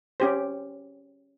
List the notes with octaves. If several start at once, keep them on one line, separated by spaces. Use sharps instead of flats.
C#4 G4 C5